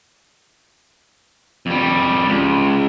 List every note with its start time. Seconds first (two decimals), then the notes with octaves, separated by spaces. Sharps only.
1.66 F2 G3
2.27 C#2